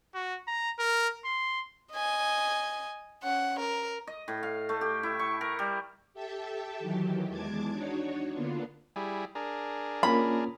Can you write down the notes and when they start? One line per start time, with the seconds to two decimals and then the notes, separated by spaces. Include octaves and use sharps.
0.15 F#4
0.47 A#5
0.79 A#4
1.25 C6
1.92 D#5 G#5
3.23 C#4 F#5
3.59 A#4
4.07 D#5
4.28 A2
4.43 F5
4.69 A3
4.81 G4
5.03 E4
5.19 C#6
5.41 A#4
5.59 G3
6.14 G4 A4 E5 G5 A5
6.79 D#3 E3 F#3 G4
7.29 E2 G#3 A5 D6 G#6
7.71 D4 D#4 F#4 C#5
8.32 D3 A#3 B3 D4 F4
8.96 G3 E4 G#4
9.35 D4 G#4 A#4
10.03 A#3 C#4 F4 B5